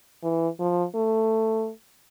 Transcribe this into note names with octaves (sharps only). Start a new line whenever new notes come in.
E3
F3
A3